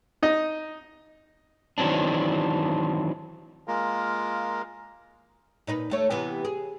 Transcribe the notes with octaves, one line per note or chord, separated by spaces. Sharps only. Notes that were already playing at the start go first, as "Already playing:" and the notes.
D#4 D#5
D#3 E3 F#3 C4 D4
G#3 A#3 F4 A#4
A#2 D#4 B4
D#2 A3 C#5
C3 E3 B3
G#4